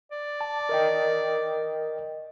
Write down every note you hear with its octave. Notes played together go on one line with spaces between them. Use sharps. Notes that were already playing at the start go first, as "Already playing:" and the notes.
D5
A5
A#4 D#5 G5